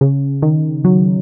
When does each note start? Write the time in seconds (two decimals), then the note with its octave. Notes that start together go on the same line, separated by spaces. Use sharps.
0.01 C#3
0.42 D#3
0.85 F#3